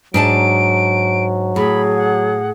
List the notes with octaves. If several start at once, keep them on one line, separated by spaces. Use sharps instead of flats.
G#2 F#3 D4 A5 D7
A2 G#4 B5
F#5